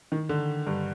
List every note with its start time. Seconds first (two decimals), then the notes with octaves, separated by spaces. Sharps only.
0.12 D#3
0.29 D3
0.67 G2